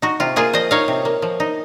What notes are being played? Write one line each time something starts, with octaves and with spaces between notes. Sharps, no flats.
D#4 F#4
C3 F4
A#3 F4 G#4
F3 C5 D#5
D#4 C#5 F5
C3
A#3
F3
D#4